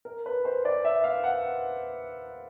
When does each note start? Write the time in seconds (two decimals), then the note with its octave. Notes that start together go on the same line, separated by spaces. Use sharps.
0.05 A#4
0.26 B4
0.45 C5
0.65 D5
0.85 E5
1.04 F5
1.24 F#5